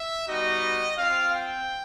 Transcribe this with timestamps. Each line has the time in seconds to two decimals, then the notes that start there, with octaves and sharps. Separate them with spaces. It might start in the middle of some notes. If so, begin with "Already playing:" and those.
Already playing: E5
0.27 G3 B3 D#4 F#4 D#5
0.97 C4 F4 F5
1.31 G5